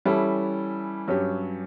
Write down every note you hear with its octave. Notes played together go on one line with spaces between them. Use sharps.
E3 G3 C#4 E4 A4
G2 F#3 C#4 G4